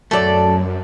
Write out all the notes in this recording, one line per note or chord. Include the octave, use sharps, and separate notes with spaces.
F#2 F#3 A3 A4 D5